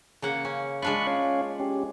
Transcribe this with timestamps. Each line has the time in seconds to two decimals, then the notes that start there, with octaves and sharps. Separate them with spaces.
0.22 C#3 A#3 F#5
0.45 C#4
0.82 G#3 D4 F4 B5 C#6 F#6
1.07 C#4 C#5 F5
1.60 C#4 G4